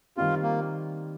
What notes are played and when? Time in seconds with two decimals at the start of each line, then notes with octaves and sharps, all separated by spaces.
0.16 D#3 G3 C4 F4 G4
0.42 A#3